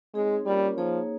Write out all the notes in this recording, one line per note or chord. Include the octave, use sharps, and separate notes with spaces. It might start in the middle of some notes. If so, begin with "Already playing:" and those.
G#3 C4 D#4 G#4 C#5
G3 A#3 C#4 F4 A#4 C#5
F3 A#3 D#4 G#4 C#5